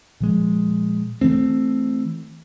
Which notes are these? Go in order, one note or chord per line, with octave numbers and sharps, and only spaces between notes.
A#2 F3 G#3
E3 A3 C4